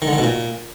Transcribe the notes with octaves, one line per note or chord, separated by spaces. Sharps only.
D#3
D3
D#3
B2
A#2